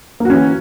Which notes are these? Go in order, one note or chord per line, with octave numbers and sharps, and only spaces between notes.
E3 A#3 C#4 F#4